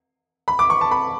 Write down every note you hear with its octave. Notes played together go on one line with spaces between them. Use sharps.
B5
D6
C#6
A5
B5